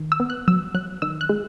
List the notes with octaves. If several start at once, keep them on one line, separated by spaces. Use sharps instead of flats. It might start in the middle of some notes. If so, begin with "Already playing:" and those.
Already playing: D#3
E6
B3
F#6
F#3 E6
F#3 F#6
D#3 E6
F#6
G#3